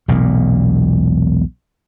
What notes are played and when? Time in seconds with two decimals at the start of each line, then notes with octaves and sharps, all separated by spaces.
0.08 E1 B1 A#2